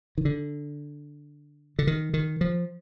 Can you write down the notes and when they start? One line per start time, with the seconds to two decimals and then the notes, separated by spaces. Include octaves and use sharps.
0.18 D#3
0.25 D3
1.79 D3
1.87 D#3
2.14 D#3
2.41 F3